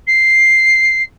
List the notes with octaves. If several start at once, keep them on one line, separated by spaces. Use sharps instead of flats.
C7